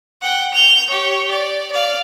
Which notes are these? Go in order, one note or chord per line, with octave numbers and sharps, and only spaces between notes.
F#5 G5
G6 F7
G4 C#5
D5
D5 F5